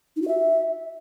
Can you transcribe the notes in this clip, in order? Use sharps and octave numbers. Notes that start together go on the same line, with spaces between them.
D#4
F#4
E5